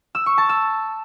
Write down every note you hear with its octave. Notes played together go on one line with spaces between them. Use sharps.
E6
C#6
A5
E6